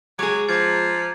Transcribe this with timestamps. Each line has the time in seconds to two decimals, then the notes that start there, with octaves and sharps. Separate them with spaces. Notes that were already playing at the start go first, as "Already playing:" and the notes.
0.19 F#3 G#3 G#4 D6
0.49 F3 A#5 D6 G#6